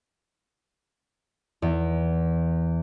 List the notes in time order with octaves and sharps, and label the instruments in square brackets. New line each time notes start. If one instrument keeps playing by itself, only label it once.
[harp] E2